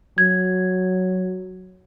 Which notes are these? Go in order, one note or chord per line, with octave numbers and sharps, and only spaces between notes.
F#3 G#6